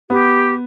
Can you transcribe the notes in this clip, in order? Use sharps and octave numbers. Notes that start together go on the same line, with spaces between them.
B3 G4